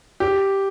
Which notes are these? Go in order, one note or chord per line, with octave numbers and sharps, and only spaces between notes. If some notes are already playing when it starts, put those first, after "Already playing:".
G4